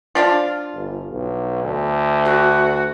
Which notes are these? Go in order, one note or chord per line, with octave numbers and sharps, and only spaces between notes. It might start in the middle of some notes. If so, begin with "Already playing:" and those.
F3 D4 F4
G1
B1
D2
F#4